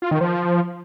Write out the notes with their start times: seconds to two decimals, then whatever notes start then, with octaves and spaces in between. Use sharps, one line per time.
0.02 F4
0.11 D#3
0.21 F3